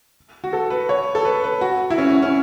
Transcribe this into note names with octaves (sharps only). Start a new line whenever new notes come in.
F#4
A4
B4
C#5
A4
B4
B4
F#4
E4
C#4
C#4
C#4